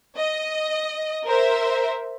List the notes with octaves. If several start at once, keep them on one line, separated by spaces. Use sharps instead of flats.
D#5
A#4 C5 E5